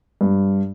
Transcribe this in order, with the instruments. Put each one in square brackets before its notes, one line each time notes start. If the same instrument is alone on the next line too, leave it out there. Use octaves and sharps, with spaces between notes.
[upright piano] G2